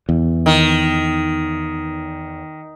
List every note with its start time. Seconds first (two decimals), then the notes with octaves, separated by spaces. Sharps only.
0.09 E2
0.46 D#3